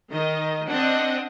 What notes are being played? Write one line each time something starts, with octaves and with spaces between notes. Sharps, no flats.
D#3 D#5
C4 D4 D#5 F#5